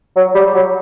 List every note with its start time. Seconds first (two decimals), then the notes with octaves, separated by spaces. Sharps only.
0.16 F#3
0.35 G3
0.55 F#3